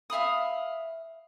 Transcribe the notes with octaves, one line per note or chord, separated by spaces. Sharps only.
E5 F5 B5 D#6